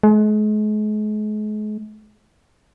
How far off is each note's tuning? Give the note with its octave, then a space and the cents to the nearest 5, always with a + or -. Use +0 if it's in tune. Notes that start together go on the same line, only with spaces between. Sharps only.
G#3 +40